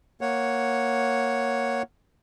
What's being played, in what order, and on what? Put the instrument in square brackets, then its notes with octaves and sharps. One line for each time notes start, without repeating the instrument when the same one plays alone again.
[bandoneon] A#3 C#5 F#5